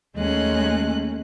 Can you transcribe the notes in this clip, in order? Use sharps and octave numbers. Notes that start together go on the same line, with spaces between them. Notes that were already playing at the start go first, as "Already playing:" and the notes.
D#2 G#3 A3 C#4 F#6